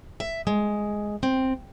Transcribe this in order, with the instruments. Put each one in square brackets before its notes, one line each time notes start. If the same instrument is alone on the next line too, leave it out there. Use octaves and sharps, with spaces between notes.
[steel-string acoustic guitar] E5
G#3
C4